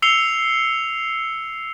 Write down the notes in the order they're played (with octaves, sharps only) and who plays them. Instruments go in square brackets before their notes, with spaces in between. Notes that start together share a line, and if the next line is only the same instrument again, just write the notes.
[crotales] E6 C7 C#7 F7 G7